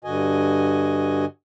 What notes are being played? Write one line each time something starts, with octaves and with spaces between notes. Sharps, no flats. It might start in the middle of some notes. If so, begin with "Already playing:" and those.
G2 D3 F#4 D#5 G#5